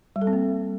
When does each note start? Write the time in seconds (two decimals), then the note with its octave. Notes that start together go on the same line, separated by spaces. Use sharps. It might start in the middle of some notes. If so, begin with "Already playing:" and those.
0.16 G3
0.21 A4
0.27 C4
0.33 A#3